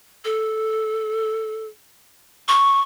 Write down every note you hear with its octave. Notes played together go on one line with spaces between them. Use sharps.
A4
C#6